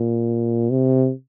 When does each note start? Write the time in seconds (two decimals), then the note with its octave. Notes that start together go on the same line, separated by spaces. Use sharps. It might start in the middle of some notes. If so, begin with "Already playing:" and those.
Already playing: A#2
0.70 C3